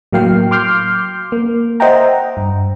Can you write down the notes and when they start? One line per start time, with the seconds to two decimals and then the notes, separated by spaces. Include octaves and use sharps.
0.13 A2 F#3 A#3 F5 G5 C7
0.51 C6 D6 F6 G6 C7
1.32 A#3
1.80 C5 D#5 E5 F#5 G5 A#5
2.37 G2